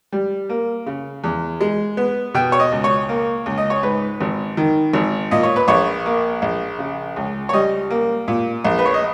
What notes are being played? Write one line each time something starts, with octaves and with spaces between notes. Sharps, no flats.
G3
A#3
C#3
E2
G#3
B3
B2 G5
C#5
D#5
C#2
C#5
A#3
C#2
D#5
C#5
G#2 B4
G#1
D#3
G#1
A#2 D#5
C#5
B4
A#1 C#5
A#3
A#1
C#3
C#2
C#5
G3 D#5
A#3
A#2
A#1
B4
C#5
D#5